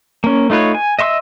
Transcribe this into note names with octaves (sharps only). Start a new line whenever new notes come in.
A#3 C#4
A3 D#4 F4 B4 C#5
G#5
D#5 E5 C6 C#6 E6